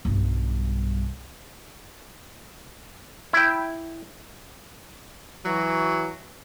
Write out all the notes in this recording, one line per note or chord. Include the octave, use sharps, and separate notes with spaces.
B1 G2
E4 G5
E3 F#3